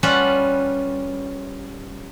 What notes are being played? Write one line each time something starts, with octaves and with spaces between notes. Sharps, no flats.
G3 C#4 F4 B4 F#5 A5